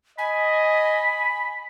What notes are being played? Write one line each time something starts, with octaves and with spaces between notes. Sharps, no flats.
D#5 G#5 B5